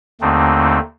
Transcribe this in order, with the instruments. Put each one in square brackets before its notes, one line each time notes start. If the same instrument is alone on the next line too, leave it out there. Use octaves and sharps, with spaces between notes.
[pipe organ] D#2 D3 A3 C4 D#4